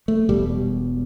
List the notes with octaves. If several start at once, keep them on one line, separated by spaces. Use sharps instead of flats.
A3
E1 E2 B2 G3